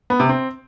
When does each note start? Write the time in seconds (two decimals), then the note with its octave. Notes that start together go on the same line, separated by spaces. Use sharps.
0.10 B3
0.20 C3
0.29 C4